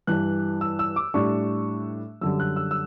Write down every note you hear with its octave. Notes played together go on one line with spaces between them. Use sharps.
G2 E3 G3 F#6
E6
E6
D6
A2 G3 D4 C#6
F#2 D3 G3 E6
F#6
E6
E6